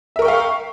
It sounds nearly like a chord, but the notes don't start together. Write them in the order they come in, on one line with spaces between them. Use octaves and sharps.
E5 A#4 C#6 G5 F5